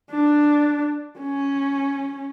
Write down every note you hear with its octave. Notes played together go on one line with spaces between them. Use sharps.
D4
C#4